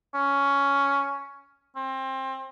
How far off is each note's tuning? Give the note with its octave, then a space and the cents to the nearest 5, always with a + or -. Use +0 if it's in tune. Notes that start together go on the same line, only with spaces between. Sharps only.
C#4 +10
C4 +25